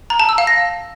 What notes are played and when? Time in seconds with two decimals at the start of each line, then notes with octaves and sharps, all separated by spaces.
0.10 A#5
0.20 A5
0.29 E6
0.38 F5
0.47 A#6